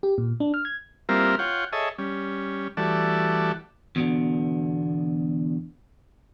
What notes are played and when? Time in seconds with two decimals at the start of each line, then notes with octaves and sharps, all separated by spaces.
0.03 G4
0.18 A#2
0.40 D4
0.54 F6
0.65 G#6
1.09 G3 A#3 C4 E4 F4 A#4
1.39 F4 C#5 F#5 G5
1.72 G#4 A4 C#5 D#5 E5
1.98 G3 C#4
2.77 E3 G3 A3 F#4 A4 D5
3.96 E2 B2 D3